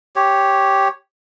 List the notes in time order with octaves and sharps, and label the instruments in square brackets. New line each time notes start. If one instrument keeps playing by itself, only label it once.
[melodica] G4 C#5